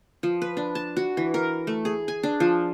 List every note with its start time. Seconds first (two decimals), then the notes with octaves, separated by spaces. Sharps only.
0.23 F3
0.42 B4
0.57 D4
0.75 A5
0.97 F#4
1.17 E3
1.34 A#4
1.67 A3
1.85 G#4
2.08 G#5
2.23 D4
2.40 F3